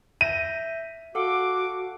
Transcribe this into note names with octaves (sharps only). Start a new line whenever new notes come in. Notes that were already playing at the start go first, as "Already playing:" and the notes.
E5 G6 A#6 D#7
F#4 A4 F5 F#5 D6